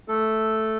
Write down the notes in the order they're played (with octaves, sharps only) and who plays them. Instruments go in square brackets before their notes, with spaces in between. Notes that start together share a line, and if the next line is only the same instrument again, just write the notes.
[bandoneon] A3 A4